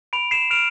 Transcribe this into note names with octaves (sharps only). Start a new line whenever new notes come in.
B5 D7 F7
C7 E7
F6 D7 F7